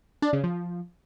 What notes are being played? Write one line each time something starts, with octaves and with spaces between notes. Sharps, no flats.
D4
C#3
F3